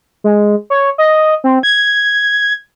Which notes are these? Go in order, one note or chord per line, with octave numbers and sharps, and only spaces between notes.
G#3
C#5
D#5
C4
G#6